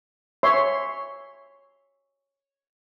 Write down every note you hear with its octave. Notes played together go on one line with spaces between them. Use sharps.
C#5 E5 C6